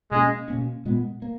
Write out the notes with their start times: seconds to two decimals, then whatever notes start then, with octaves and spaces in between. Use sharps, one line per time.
0.11 B2 G#3 A#3 C#4
0.48 B2 A#3 C#4
0.85 A#2 G#3 B3
1.22 A#3